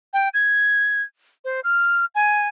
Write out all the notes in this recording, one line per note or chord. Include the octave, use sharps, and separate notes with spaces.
G5
G#6
C5
F6
G#5